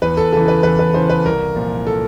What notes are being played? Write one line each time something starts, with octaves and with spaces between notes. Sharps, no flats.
E2 B4
A4
C#3 E3 A4
B4
E2 B4
B4
C#3 E3 C5
B4
C2 A#4
A#2 F3
A4